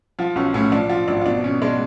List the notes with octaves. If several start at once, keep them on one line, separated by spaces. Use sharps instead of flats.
F3 F4
B1 C#4
A2 C#4
F3 D4
F3 F4
G#1 D4
F4
B2 D4
B2 C#4
G#3 D4